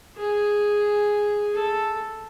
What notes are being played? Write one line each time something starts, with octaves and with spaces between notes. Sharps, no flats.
G#4
A4